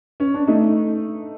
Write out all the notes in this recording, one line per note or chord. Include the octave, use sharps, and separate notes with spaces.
C#4
D4
A3 D#4